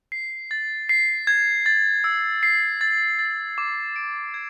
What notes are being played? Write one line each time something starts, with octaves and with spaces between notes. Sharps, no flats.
C7
A6
C7
G#6
A6
E6
C7
A6
A6
D6
D7
G#6